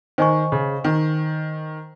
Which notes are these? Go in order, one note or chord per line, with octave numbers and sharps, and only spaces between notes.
D#3 C5 D#5 G#5 C#6
C#3
D#3